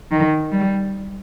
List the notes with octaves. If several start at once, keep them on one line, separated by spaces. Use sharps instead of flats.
D#3
G3